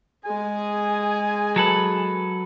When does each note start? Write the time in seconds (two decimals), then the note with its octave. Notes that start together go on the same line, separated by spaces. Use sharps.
0.25 G#3 G#4 G#5
1.56 F#3 A4 B4